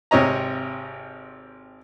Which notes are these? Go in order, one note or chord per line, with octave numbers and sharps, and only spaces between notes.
G#1 C3 C#5 D#5 A#5